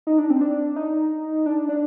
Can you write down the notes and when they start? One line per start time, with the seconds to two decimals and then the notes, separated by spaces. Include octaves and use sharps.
0.07 D#4
0.18 D4
0.30 C4
0.41 D4
0.76 D#4
1.46 D4
1.69 D4